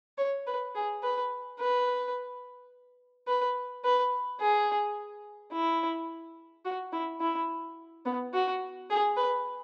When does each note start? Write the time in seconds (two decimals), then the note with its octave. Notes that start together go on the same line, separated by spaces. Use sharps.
0.18 C#5
0.47 B4
0.75 G#4
1.03 B4
1.59 B4
3.27 B4
3.84 B4
4.40 G#4
5.52 E4
6.65 F#4
6.93 E4
7.21 E4
8.05 B3
8.33 F#4
8.90 G#4
9.17 B4